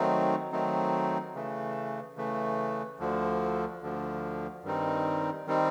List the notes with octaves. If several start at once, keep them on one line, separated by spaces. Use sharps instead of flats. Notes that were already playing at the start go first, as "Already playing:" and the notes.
Already playing: D#3 F#3 A3 C4 D#4
D#3 F#3 A3 C4 D#4
C#3 E3 A3
C#3 E3 A3
D2 D3 F3
D2 D3 F3
G2 D#3 G3 C4 D#4
D#3 G3 C4 D#4